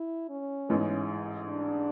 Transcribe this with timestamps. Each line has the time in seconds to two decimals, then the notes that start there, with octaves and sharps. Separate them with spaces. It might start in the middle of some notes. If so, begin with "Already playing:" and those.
Already playing: E4
0.29 C#4
0.69 A1 G#2 E3 G#3 B3
1.49 D4